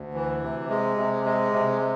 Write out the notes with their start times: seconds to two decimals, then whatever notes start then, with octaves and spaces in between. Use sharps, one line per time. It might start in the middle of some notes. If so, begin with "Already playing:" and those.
Already playing: D2
0.14 E3
0.42 C3
0.70 G#3
0.97 C3
1.25 G#3
1.52 C3